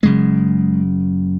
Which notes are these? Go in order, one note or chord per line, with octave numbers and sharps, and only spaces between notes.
F#1 F#2 C#3 G#3